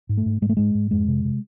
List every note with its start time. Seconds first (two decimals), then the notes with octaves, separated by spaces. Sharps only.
0.09 G#2
0.17 A3
0.26 G#2
0.42 G#2 G#3
0.49 A3
0.57 G#2 G#3
0.75 G#2
0.91 F2 G#3
1.08 C3
1.24 C3